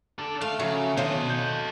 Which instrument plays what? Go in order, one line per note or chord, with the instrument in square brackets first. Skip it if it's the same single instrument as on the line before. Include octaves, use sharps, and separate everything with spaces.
[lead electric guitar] D4 A4
[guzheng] A3 [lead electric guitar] F5
[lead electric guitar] C#3 [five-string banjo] F3 F#4 [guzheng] F#3 [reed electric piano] E5
[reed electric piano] B2 D#3 [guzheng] D4 C5 [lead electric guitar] A4 D#5 [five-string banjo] C#5 F5
[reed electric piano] G6